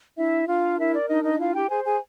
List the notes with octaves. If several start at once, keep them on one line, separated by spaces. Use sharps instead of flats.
D4 E4 E5
D4 F4 F5
E4 A#4 E5
D5
D4 D#4 D#5
D#4 D#5
E4 F4 F5
G4 G5
G#4 C5 G#5
G#4 G#5